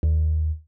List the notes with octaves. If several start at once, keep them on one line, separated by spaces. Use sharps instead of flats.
D#2